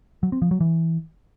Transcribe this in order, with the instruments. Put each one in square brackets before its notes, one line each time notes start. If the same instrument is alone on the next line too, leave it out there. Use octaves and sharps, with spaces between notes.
[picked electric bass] F#3
C4
F3
F#3
E3